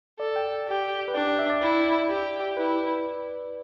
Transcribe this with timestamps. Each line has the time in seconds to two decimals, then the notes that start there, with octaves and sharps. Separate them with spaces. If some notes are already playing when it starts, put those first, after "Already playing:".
0.19 A4 D5
0.36 G5
0.67 G4
1.08 B4
1.14 D4 D5
1.28 G5
1.39 E5
1.50 D5
1.62 E4
2.09 G4
2.57 E4 B4